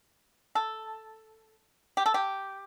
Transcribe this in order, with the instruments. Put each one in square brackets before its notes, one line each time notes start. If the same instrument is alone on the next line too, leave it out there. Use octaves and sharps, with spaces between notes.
[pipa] A4
G4
A4
G4